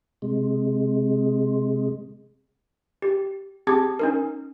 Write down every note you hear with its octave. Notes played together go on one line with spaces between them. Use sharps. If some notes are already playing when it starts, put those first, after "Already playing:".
C3 G#3
G4
C4 G4 G#4 A5 D6 G#6
C#4 D#4 A#4